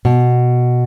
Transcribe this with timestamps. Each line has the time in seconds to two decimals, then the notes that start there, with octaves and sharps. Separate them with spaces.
0.05 B2